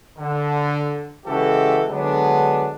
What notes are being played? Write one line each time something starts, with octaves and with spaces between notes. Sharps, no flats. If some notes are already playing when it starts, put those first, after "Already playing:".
D3
C#3 E3 G#3 F#4 G4 A4
D3 F#3 G#3 B3 D4